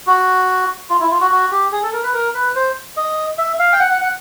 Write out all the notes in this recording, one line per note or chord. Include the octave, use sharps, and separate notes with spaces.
F#4
F4
E4
F4
F#4
F#4
G4
G#4
A4
A#4
B4
A#4
B4
C5
D#5
E5
F5
G5
F#5
F#5
F#5